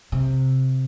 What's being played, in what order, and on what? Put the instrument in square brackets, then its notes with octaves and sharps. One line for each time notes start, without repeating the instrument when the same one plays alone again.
[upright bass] C3